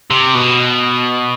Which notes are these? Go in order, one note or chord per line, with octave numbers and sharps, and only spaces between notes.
C3
B2